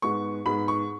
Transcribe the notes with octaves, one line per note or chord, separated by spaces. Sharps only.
G#2 G#3 B3 C#6
G#2 G#3 B3 B5
C#6